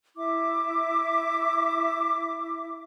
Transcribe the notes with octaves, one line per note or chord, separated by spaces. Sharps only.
E4 E5 D6